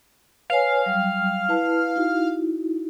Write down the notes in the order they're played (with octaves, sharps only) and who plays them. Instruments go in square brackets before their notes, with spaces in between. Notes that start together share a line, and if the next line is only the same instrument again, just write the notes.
[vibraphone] B4 C#5 G#5 [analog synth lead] F5
[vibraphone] F#3 G3 G5
E4 B4 A5
D#4 E4 F#4